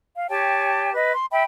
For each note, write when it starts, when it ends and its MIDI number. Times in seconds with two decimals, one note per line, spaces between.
0.16 0.27 77
0.30 0.93 67
0.30 0.93 73
0.30 0.93 79
0.30 0.93 81
0.94 1.13 71
0.94 1.13 75
1.14 1.27 84
1.31 1.44 76
1.31 1.44 79
1.31 1.44 83